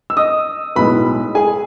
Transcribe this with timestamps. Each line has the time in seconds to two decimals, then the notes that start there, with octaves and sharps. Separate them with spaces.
0.10 E6
0.17 D#5 D#6
0.76 B1 A2 G#3 B4 B5
1.35 G#4 G#5